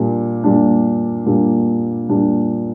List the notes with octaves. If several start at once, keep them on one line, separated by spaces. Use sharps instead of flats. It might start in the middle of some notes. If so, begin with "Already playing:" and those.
Already playing: A#2 G3 D4
A#2 G3 D4
A#2 G3 D4
A#2 G3 D4